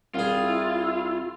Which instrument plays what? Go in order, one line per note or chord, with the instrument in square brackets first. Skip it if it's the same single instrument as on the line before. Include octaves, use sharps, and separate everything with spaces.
[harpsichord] C2 G#4 [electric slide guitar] F4
[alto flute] E4